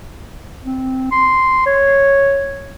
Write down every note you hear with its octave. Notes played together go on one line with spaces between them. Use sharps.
C4
C6
C#5